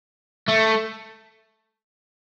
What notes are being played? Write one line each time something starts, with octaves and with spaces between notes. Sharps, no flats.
A3